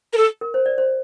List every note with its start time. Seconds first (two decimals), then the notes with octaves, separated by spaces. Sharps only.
0.13 A#4
0.18 A4
0.41 A#4
0.54 C5
0.66 D5
0.78 C5